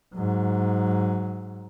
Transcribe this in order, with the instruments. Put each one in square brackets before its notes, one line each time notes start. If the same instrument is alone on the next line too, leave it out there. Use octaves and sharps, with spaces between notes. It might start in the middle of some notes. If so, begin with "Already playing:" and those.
[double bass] G#2 F#3